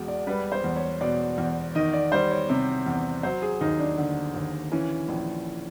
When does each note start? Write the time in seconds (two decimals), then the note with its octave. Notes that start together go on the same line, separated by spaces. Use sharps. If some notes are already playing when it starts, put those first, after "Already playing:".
Already playing: E1 E2
0.08 D5
0.27 G3 B4
0.52 C5
0.64 E2
0.76 C#5
1.01 B2 D5
1.38 E2
1.75 D#3 D#5
1.94 D5
2.12 G3 C5
2.31 C#5
2.49 C3
2.86 E2
3.23 F#3 C5
3.42 G#4
3.61 D#2 D#4
3.79 D4
3.98 D3
4.35 D#2
4.72 E3 C#4
5.08 A#1